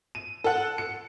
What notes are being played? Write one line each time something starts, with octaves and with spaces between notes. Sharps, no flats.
D#7
A4 F#5
C#7